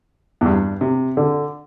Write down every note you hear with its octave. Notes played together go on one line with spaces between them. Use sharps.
E2
G2
C3
D3